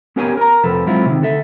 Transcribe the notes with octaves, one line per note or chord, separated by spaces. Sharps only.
B3 C#4 G4 A#4 C#5 G#5
A#4 A#5
F2 C3 F3 A4 B4
F#3 G#3 C4 C#4 E4 F4
C3 D#3
D3 A4 E5